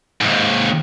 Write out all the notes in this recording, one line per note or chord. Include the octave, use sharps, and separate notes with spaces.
D#2 G#2